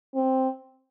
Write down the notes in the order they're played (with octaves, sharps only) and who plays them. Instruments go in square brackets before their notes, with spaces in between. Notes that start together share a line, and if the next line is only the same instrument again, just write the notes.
[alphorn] C4